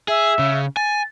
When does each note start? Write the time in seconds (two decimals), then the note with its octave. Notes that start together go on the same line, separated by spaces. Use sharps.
0.08 G#4 E5
0.39 C#3
0.77 G#5 A6